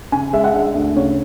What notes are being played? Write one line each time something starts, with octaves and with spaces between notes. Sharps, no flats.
C#3 G#5
G#3 E5
F#5
D4 E5
D2
C#3 C#5